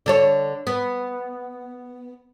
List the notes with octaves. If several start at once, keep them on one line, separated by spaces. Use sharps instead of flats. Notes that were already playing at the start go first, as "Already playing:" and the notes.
D3 A4 C#5
B3